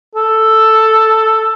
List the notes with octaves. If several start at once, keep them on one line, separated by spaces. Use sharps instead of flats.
A4